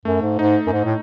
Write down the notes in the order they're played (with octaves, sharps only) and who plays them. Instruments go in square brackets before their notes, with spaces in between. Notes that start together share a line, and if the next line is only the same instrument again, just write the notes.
[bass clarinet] F#2 [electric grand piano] A3
[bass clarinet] G#2
[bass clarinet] G#2 [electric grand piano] D#4
[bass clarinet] F#2
G#2
A2